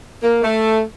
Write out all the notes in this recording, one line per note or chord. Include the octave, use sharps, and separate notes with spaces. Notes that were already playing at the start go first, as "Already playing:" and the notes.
A#3
A3